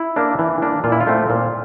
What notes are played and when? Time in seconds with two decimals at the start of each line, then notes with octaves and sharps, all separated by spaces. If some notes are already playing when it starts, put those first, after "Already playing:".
Already playing: E4
0.16 A#3 D4
0.39 E3
0.62 A#3 D4
0.84 A#2 F4
0.92 E4
1.00 F4
1.07 A3 C4
1.30 A#2